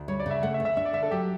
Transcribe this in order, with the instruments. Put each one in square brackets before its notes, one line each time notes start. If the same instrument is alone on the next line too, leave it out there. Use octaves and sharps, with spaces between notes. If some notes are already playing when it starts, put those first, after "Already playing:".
Already playing: [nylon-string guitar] D2
[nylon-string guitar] G3 [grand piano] C#5
[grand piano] D5
[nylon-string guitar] C#3 [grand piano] E5
[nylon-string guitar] A3 [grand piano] F#5
[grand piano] E5
[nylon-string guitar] D2
[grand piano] E5
[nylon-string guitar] D4 [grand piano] E5
[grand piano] D5
[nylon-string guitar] D3 [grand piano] E5
[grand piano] A4
[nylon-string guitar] F#3 [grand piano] G4